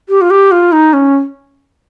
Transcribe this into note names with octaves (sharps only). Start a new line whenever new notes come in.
G4
F4
G4
F4
D#4
C#4